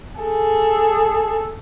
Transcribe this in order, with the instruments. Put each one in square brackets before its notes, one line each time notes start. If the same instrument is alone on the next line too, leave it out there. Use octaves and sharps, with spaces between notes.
[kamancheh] G#4 A4